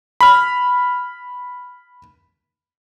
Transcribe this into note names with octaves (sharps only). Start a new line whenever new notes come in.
B5 F6